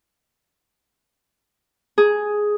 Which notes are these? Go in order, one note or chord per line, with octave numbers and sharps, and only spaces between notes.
G#4